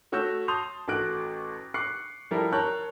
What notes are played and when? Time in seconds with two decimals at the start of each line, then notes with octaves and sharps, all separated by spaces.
0.12 A3 F#4 C#5 E6 G6 E7
0.48 A5 C6 D#6 G6 F7
0.88 A1 A3 F#4 F#6 D7
1.74 C#6 D6 F#6 C7 C#7
2.31 F3 G3 E4 A4 A#4 E5
2.52 A#4 C#5 A5 C#6 F#6 G6